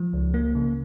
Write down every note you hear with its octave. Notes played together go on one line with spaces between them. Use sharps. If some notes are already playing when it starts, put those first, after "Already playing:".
Already playing: F3
C#2
A#3
C#3